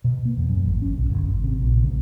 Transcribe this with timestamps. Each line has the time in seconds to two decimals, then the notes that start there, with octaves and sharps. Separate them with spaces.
0.04 B2
0.25 A#3
0.37 E2
0.49 F#2
0.66 G#1
0.82 C#4
0.98 B1
1.10 G1
1.25 G#1
1.43 C3
1.62 A#1
1.83 C#2